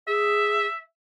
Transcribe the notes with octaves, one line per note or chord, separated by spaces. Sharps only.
G#4 E5